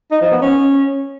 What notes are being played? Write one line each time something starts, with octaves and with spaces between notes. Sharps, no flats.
D#4
F3
B3
C#4